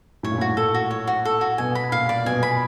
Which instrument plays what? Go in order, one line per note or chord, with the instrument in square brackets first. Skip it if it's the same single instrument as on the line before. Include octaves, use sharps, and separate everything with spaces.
[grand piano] A2 [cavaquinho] C#5
[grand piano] A#2
[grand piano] A2 [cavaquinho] F#4
[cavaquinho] A4
F#4
C#5
F#4
A4
F#4
[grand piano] B2 [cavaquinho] G#5
[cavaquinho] B5
[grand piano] A#2 [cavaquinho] F5
[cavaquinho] D5
[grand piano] B2 [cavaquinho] G#5
[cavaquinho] B5